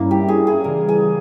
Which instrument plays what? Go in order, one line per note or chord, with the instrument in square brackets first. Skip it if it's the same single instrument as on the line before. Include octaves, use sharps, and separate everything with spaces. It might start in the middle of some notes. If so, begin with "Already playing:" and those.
Already playing: [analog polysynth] G2 G3 C#4 E4 [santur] A#3
[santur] G4
G#4
G#4
[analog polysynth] C#3 E3 G3 [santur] A#4
[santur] G#4